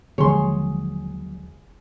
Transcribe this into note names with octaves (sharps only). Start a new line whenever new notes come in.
D#2 D3 F3 F#3 G#3 G#4 C#5 C6